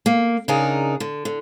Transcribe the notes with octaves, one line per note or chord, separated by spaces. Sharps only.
A#3
C#3 D4 D#4 G#4 A#4
D3
D3